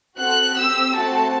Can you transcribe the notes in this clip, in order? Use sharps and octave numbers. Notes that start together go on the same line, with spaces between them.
C4 F#4 A4 F#6
C4 G4 E6
A3 C4 F#4 A5